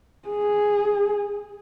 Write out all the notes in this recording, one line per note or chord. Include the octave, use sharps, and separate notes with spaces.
G#4